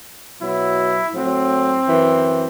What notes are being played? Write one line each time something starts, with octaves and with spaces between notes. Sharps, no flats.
B2 F#3 E4
A2 F#3 C4
F#2 E3